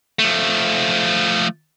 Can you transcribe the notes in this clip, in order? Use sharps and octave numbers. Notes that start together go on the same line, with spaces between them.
F3 A3